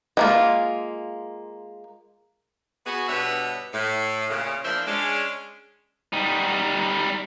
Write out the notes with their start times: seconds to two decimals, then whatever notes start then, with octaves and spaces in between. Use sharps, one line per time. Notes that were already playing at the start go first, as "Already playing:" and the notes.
0.17 G#3 A#3 F4
2.86 B3 F#4 G#4
3.09 G2 B2 D4 B4 C#5 E5
3.73 A2
4.30 A#2 C#3
4.64 E2 F3 A#3 D4 C5 E5
4.86 G#3 C#4 D4
6.13 G3 D#4